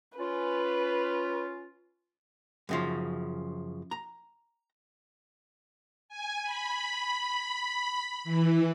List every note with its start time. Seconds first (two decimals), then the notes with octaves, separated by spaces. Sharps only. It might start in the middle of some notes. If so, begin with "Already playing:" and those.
0.18 C#4 F4 B4
2.69 F#2 C#3 F3
3.91 A#5
6.09 G#5
6.43 B5
8.24 E3